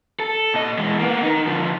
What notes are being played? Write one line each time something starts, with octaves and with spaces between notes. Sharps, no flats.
A4
A#2 D#5
E3 G#3
A#3 B3
D#4 A#4
D3 F3